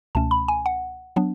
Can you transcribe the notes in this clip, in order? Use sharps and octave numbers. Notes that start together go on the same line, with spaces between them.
C#2 B2 A3 C#4 A5
B5
G#5
F#5
F#3 B3 D4